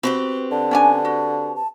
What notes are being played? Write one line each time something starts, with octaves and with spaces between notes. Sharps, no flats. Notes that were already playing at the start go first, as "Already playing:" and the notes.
C4 F#4 G4 B4 B5
D3 A5
C#4 D4 G#5
F#4
A5